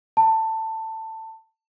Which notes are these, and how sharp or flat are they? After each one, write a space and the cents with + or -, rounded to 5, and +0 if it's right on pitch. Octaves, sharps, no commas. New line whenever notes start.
A5 +15